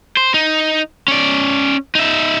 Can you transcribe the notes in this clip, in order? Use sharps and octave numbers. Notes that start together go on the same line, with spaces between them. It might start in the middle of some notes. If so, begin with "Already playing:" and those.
C5
D#4
C#4 D5
D#4 E5